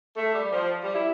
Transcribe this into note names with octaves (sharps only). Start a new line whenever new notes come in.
A3
G3
F3
G3
E4